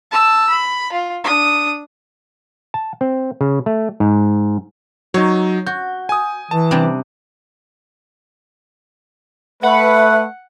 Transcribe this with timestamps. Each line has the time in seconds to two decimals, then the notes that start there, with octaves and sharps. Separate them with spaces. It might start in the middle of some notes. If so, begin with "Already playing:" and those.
0.11 A5 E6
0.49 B5
0.92 F4
1.24 D4 D#6
2.74 A5
3.01 C4
3.41 C#3
3.66 A3
4.00 G#2
5.14 F#3 D#4 C#5
5.66 F#4 G6
6.09 G#5 D#6
6.51 E3 A5
6.71 C3 G3 D4
9.63 A3 B4 E5 F#5